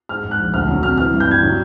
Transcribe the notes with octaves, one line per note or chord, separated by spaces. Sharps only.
G#2 F6
G#2
F#6
A#1
D2 F6
F#3
C3 F6
E3 F6
G2
G6
G3 G#6
F#3